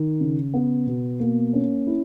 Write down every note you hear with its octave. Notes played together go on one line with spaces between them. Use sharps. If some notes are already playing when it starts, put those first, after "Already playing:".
Already playing: D#3
C#3
B3
B2
A#3
C#4
E4